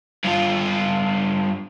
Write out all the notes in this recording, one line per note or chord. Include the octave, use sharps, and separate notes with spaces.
G2 F4